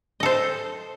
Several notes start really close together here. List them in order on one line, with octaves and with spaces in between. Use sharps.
D#5 A4 C5